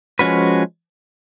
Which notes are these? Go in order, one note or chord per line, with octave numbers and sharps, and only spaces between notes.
F3 G#3 C#4 F#4 B4